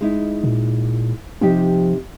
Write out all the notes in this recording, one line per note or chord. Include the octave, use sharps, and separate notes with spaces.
G#3 D#4 E4
A#2
C3 F3 D#4 G4